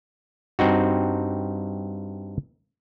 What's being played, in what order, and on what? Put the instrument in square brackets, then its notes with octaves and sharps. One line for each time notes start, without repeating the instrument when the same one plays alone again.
[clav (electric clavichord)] G2 C4 D#4 F#4